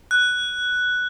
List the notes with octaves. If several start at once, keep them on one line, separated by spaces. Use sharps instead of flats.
F#6